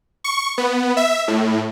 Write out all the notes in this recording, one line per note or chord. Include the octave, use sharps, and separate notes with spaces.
C#6
B3
E5
A2